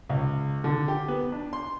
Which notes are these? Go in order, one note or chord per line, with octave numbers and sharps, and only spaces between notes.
C#2
D3
G4
B3
D4
C6